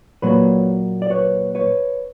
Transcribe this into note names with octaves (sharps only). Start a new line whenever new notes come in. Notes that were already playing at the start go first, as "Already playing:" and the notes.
A#2 F#3 A#3 B4 C#5
D5
B4 C#5
B4 C#5